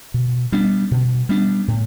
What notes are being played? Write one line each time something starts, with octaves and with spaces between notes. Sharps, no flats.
B2
G3 B3 D4
B2
G3 B3 D4
A2